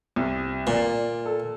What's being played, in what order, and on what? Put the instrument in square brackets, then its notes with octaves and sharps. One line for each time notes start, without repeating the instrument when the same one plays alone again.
[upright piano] C2
[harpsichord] A#2 [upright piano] D5
[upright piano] A4